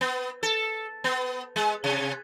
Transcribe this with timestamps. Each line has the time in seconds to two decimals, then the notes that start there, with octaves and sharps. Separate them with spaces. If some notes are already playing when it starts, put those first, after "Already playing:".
0.01 B3
0.43 A4
1.04 B3
1.56 G#3
1.84 C3